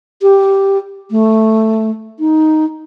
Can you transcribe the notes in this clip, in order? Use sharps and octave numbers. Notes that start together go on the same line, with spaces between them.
G4
A3
D#4